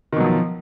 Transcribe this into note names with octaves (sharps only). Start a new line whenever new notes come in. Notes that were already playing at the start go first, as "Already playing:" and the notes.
B2 D#3 F3 F#3